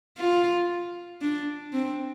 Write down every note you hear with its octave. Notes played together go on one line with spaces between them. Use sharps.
F4
D4
C4